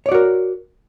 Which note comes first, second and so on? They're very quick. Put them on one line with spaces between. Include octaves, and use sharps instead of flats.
C#5 D5 F#4 A#4